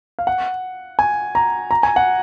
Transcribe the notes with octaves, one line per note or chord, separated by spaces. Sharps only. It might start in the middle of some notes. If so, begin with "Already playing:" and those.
F5
F#5
G#5
A#5
A#5
G#5
F#5